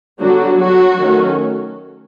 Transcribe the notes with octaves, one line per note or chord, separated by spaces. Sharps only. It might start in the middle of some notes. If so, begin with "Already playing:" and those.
D3 F#3 G3 B3 D4 F#4
F#3 F#4
D#3 F#3 A3 C#4